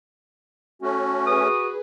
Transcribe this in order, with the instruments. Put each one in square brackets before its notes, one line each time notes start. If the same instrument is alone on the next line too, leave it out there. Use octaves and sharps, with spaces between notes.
[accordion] A3 C#4 [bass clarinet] F#4
[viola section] G#4 B4 [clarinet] D#6